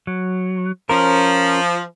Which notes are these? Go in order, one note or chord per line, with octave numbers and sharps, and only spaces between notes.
F#3
F3 C#4 A#4